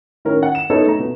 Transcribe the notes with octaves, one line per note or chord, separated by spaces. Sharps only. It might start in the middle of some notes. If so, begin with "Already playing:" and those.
A2 D#3 C#4 A#4
F#5
E7
B3 D#4 E4 A4 B4 C#5
A3 A#5
B2